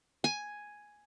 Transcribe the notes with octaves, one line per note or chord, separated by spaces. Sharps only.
G#5